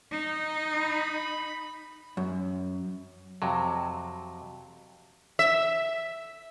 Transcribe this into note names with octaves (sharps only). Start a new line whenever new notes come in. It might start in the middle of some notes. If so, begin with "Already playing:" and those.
D#4
B5
F#2
F2 C3 F#3
E5